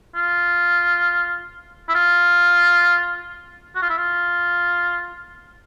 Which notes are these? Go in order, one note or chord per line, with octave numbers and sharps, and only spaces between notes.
F4
E4
F4
F#4
F4
E4
F4